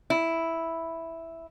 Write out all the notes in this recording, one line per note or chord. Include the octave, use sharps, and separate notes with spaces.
E4